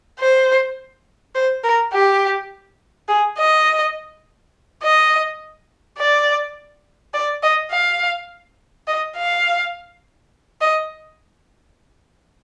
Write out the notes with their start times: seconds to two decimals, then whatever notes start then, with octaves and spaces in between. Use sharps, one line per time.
0.20 C5
1.35 C5
1.63 A#4
1.93 G4
3.08 G#4
3.38 D#5
4.83 D#5
5.98 D5
7.14 D5
7.43 D#5
7.72 F5
8.87 D#5
9.17 F5
10.61 D#5